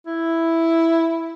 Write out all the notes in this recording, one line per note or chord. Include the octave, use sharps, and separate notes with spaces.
E4